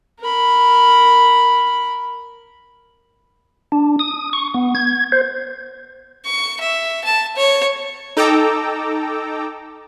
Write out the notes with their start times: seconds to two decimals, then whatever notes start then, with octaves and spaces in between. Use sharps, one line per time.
0.20 A#4 B5
3.72 D4
3.99 D#6
4.33 C#6
4.54 B3
4.75 G#6
5.12 C5
6.26 C#6
6.60 E5
7.04 A5
7.36 C#5
8.17 D#4 A4 G5 A#5 D6 E6